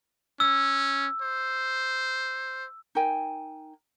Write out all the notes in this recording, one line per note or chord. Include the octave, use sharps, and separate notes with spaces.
C#4 E6
C5
D#4 A#4 G5 G#5